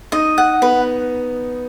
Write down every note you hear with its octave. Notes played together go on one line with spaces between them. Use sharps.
D#4 D#5
F#5
B3 B4